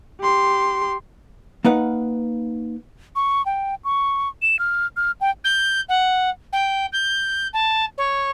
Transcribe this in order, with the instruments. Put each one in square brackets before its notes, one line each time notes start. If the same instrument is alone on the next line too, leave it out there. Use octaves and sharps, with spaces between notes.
[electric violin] G4 C6
[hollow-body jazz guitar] A#3 D#4 B4 F#5
[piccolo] C#6
G5
C#6
E7
F6
F6
G5
[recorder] G6
F#5
G5
G6
A5
C#5